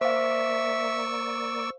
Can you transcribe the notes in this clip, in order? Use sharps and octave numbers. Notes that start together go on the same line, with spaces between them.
A#3 C5 D5 E5 F5 C#6 E6